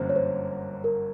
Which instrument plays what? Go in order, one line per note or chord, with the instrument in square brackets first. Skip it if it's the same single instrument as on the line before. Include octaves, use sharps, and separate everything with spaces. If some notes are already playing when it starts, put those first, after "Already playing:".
Already playing: [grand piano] G1 F#2 D3 F3 A#3 [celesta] C5
[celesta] C#5
C5
A#4